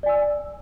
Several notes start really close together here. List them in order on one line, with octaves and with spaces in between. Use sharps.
D5 G#5 E6